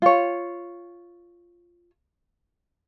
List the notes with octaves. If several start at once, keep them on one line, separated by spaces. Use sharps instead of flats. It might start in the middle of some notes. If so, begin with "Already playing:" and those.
F4 C#5